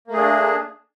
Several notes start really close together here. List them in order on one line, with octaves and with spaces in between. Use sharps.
A#3 A3 G#4 D4